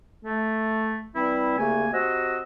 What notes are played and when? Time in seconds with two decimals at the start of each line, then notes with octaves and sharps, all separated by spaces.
0.24 A3
1.14 E3 G3 C4 E4
1.57 C2 C#3 A3 A#3 G#5
1.93 C3 F#4 C5 D#5 F#5 E6